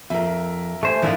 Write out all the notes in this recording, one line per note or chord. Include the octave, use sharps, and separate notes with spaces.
F2 A#4 E5
A3 G4 C5 G#5
G1 G2 D#3 F3 E4 F4